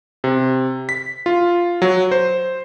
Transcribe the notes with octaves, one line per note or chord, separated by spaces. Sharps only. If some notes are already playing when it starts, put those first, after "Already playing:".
C3
B6
F4
F#3
C5